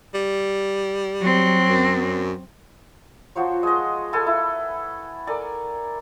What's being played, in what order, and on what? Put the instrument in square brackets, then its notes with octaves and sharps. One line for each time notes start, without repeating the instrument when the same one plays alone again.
[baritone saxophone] G3
[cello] F#3 C4
[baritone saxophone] F#2
[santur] F3 F#4 C5 C#5
G#3 D#5
A4 B4 G#5
E4
A4 A#4 D5 G#5